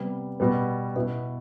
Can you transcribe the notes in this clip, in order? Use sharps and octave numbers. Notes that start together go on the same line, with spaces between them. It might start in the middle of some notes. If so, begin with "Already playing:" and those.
Already playing: C3 G3 B3
B2 G3 B3
B2 B3 E4